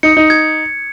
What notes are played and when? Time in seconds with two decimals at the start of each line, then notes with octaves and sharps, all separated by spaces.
0.03 D#4 C#7
0.17 D#4
0.30 G#6